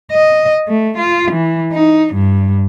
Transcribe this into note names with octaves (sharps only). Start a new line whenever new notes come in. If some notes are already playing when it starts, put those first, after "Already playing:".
D#5
A3
F4
E3
D#4
G2